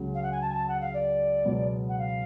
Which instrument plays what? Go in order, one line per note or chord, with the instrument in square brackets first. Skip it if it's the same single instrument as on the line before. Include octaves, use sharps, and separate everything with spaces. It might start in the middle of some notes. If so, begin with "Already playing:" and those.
Already playing: [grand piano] C#2 C#3 F#3
[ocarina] F5
F#5
G#5
A5
G#5
A5
F#5
F5
D5
[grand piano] C#2 B2 F#3 B3
[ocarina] F#5
F5